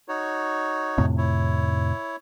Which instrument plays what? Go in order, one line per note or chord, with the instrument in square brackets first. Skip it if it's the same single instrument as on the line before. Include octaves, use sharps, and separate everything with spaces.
[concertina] D#4 F#4 C#5
[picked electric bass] F2 A2 C3
[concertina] E4 C#5